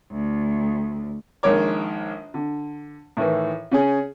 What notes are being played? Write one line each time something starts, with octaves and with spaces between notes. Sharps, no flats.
D2
A#1 D#3 G#3 A#4 C#5 D6
D3
A2 D#3 E3
C#3 C#4 G#4